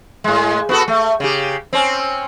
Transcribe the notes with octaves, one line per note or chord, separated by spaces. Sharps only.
A2 G#3
B3 F#4 A4
A3
C#3 G4
C4 C#4